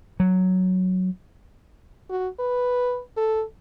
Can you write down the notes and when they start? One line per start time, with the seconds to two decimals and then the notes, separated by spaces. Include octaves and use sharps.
0.20 F#3
2.09 F#4
2.39 B4
3.17 A4